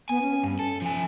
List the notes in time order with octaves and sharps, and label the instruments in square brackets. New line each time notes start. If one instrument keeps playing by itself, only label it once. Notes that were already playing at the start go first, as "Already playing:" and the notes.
[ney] B3 [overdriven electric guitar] G#5
[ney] C#4
[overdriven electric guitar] G2
A4
F3 G#5